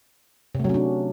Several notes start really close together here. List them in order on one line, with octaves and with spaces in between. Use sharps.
C3 A3 F#3 C#4 D4